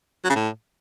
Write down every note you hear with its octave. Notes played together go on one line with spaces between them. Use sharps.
F#3
C#3
A2